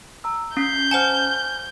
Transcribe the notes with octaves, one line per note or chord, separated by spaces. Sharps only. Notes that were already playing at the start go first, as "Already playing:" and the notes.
A#5 E6
C#4 G6 B6 C7
C5 F#5 G#5 A5 F6